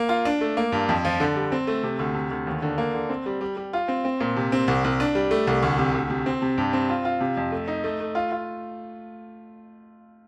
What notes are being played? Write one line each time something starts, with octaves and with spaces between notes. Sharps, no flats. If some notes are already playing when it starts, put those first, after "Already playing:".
Already playing: A#3
F4
D4
A3
A#3
G2
F2
F3
D3
G3
C4
A3
C3
D2
C3
D2
D#2
D3
A#3
D3
C4
G3
G3
G3
F4
C4
C4
A#2
C3
C4
C2
C2
D4
G3
A3
C2
D2
C3
D2
C3
C4
C3
G2
C4
F4
F4
C3
F2
A3
D#4
A3
A3
F4
F4